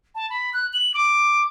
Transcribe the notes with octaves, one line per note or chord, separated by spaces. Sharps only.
A5
B5
F#6
F#7
D6